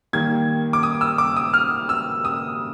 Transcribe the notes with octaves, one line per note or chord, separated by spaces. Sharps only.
D#3 G3 A#3 G#6
D6
D#6
E6
D6
D#6
F6
E6
D#6